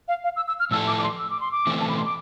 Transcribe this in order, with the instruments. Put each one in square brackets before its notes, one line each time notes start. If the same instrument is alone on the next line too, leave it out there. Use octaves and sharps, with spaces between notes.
[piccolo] F5
F5
E6
E6
F6
[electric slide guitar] A2 F3 A3 E4 A4 [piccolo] E6
[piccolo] D6
D6
C6
E6
D6
C6
D6
[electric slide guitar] E3 A3 C4
[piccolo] A5
B5
C6
D6